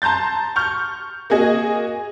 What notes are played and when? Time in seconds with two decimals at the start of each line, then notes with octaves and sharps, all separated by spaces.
0.02 A5 A#5 C6 G6 A6
0.56 C#6 F6 G6
1.30 A#3 F#4 G#4 D#5